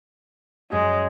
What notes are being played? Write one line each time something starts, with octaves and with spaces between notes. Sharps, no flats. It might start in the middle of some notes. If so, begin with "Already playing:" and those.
F#2 G#3